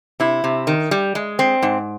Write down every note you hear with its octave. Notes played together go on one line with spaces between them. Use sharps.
C3 E4
C3
D#3
G3
G#3
C4
G#2